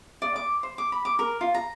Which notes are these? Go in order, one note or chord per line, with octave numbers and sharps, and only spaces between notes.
D5
D6
C5
D6
B5
D6
A#4
F4
A#5